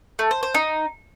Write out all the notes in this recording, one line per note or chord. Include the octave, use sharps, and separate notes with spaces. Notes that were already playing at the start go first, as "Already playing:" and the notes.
A3
C5
C5
D#4